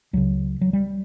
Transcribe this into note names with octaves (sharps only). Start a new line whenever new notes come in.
C#2 C#3 F#3
F#3
G3